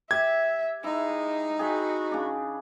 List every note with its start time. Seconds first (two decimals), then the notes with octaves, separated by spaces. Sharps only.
0.11 G4 E5 G#6
0.84 G#3 D#4 E4
1.59 F#4 G#4 G5 B5
2.11 C#3 D4